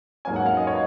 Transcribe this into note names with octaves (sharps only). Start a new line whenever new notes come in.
G#2 F#3 A#3 C#4 G#5
F#5
F5
D#5
C#5